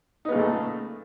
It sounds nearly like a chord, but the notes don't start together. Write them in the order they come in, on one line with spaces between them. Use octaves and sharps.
D#4 B3 C#3 A#2 A3